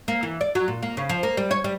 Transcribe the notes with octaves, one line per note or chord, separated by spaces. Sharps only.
A#3
E3
D5
F#3
A#2
A#3
C#3
F3
A#3
G3
C#5
G3